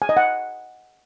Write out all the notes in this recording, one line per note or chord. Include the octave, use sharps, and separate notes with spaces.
G#5
D#5
F#5